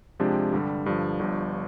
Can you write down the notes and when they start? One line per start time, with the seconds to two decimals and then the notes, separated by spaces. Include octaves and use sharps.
0.20 C3 F3 G#3 D4 G4
0.53 G2 D3 G3
0.86 G2 D3 F3
1.19 G1 G2 F3